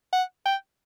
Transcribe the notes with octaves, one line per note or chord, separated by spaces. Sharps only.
F#5
G5